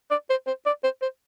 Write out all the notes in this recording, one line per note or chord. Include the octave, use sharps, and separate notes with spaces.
D5
C5
C5
D5
C5
C5